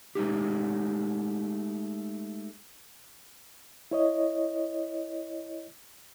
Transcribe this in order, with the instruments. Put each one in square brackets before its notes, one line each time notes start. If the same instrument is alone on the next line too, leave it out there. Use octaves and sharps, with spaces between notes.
[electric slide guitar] G#3 A3 D#4 G4
[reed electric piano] E4 C#5 D#5